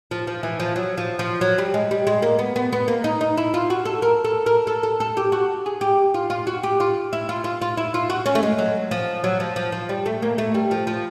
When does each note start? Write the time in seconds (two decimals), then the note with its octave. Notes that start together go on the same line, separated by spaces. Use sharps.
0.11 F3
0.27 F3
0.43 E3
0.60 F3
0.76 F#3
0.97 F3
1.19 F3
1.41 F#3
1.58 G3
1.74 G#3
1.91 G3
2.07 G#3
2.22 A#3
2.39 B3
2.56 B3
2.72 B3
2.88 A#3
3.04 D#4
3.21 D#4
3.37 E4
3.54 F4
3.70 F#4
3.85 A4
4.02 A#4
4.24 A4
4.46 A#4
4.67 A4
4.83 A4
5.00 A4
5.17 G4
5.32 F#4
5.66 G#4
5.81 G4
6.14 F4
6.30 F4
6.47 F#4
6.63 G4
6.80 F4
7.13 E4
7.29 F4
7.44 F4
7.62 F4
7.77 E4
7.94 F4
8.10 F#4
8.26 C#4
8.35 A3
8.43 G#3
8.58 F#3
8.91 F3
9.24 F#3
9.40 F3
9.56 F3
9.72 F3
9.89 G3
10.06 A3
10.22 A#3
10.38 A3
10.54 G3
10.71 F3
10.87 F3